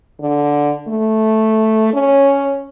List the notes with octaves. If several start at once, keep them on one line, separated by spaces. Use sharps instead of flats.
D3
A3
C#4